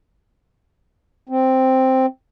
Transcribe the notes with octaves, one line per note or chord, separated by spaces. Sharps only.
C4